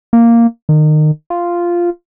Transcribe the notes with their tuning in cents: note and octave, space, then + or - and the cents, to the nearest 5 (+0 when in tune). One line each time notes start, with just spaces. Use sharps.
A#3 -5
D#3 -25
F4 -5